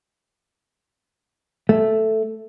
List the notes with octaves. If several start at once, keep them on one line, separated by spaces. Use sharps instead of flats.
A3